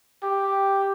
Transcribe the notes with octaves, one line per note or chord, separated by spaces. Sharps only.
G4